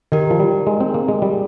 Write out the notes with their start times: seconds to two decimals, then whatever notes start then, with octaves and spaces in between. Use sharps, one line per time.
0.12 D#3 D#4 G4 A#4
0.31 F3
0.40 G3
0.67 G#3
0.80 C4
0.94 A#3
1.08 G#3
1.22 G3